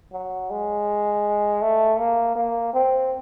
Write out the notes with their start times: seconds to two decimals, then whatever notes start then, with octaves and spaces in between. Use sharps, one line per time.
0.13 F#3
0.50 G#3
1.62 A3
1.99 A#3
2.35 A#3
2.74 C4